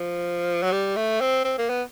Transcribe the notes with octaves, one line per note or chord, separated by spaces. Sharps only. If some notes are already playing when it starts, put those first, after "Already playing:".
Already playing: F3
F#3
G3
A3
C4
C4
A#3
B3